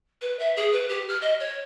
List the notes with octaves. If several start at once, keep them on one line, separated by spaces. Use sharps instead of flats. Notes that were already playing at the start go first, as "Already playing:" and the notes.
B4
E5
G#4
B4
G4
F6
D#5
C#5